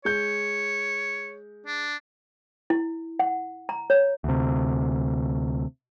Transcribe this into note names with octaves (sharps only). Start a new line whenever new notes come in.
G#3 C#5 G6
D4
E4
F#5
A#5
C#5
D2 C3